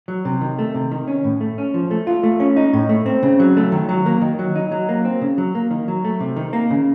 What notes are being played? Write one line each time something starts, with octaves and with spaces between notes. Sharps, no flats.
F#3
C3
D#3
A3
C3
D#3
C#4
A2
A3
C#4
F3
A3
F4
A3
C#4
D#4
A2
A3
C4
C#3
F#3
A3
D#3
F#3
A#3
D#3
F#3
D#4
F#3
A#3
C4
C#3
F#3
A#3
D#3
F#3
A3
C3
D#3
A#3
C#3